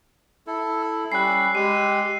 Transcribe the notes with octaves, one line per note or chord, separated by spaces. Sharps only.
E4 A4
E6
G3 C#4 B5 F#6 C7
G#3 G4 D#7